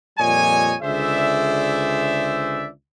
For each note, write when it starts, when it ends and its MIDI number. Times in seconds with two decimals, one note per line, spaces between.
0.19 0.75 41
0.19 0.75 46
0.19 0.75 55
0.19 0.75 73
0.19 0.75 75
0.19 0.75 80
0.82 2.68 37
0.82 2.68 50
0.82 2.68 68
0.82 2.68 72
0.82 2.68 74
0.82 2.68 76